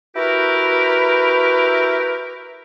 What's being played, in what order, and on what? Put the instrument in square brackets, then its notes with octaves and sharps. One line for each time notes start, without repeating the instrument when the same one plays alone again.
[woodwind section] E4 F#4 G4 A#4 B4